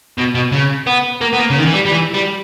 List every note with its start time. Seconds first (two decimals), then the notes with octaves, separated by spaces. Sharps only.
0.18 B2
0.35 B2
0.52 C#3
0.87 B3
1.21 A#3
1.33 B3
1.39 A#3
1.50 C#3
1.58 D#3
1.66 E3
1.73 G3
1.86 G3
1.91 E3
2.14 G3